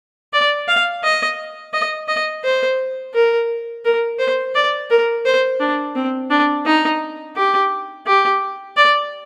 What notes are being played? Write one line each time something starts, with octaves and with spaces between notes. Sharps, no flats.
D5
F5
D#5
D#5
D#5
C5
A#4
A#4
C5
D5
A#4
C5
D4
C4
D4
D#4
G4
G4
D5